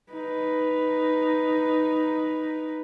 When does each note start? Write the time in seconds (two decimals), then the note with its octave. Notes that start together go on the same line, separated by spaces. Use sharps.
0.12 D#4 B4